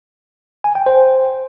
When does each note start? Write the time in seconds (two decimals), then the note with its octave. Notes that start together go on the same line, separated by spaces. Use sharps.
0.64 G#5
0.75 G5
0.86 C5